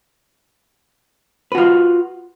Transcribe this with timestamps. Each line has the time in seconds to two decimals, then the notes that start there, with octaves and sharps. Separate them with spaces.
1.52 B4
1.55 F#4
1.58 F4